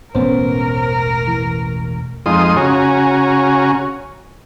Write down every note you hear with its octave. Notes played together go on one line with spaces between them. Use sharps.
E1 A1 A3 B3 C#4 A#4 C5
E3
F2 G#3 D#4 F4 C6 D#6
C#3 C#4 F#4 G#5 A#5